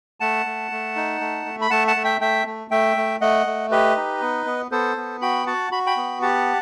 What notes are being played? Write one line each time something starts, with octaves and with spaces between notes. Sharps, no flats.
A3 F#5 A5
A3
A3
D#4
A3
A3
B5
A3 F#5 A5
F#5 A5
A3
E5 G5
A3 E5 G5
A3
A3 E5 G5
A3
A3 D#5 F#5
A3
G4 B4 D#5
D#4
B3
B3
B3 A4 C5
B3
F#4 G5 B5
F#4 F#5 A5
F#4 B5
G5 B5
B3
G4 F#5 A5